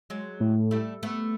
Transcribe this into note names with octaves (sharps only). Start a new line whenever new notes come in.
F#3 G#3
A2
G3 A3
A3 B3